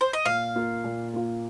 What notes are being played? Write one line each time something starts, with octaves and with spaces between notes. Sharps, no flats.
C5
D#5
A#2 F5
A#3 F4
A#2
A#3 F4